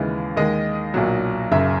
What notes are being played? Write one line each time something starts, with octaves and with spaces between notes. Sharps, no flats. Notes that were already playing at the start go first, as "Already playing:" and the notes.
Already playing: D#2 C#3 E3 G#3
D#2 D#3 G#3 D#5
B1 A#2 F#3
F#1 F#2 C#3 E5